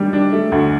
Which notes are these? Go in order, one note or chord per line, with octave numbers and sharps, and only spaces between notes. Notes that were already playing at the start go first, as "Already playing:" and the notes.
Already playing: D#3 G3 D4
D4
A3
D2